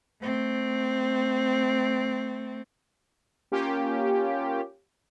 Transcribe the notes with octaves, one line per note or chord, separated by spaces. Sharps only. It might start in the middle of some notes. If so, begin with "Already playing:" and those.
A3 C4
A#3 C#4 F4 G4